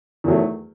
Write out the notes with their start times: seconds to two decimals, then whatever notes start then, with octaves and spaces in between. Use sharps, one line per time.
0.24 E2 D#3 F#3 A3